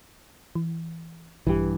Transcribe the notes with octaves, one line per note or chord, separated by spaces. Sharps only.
E3
A#1 G2 E3 G4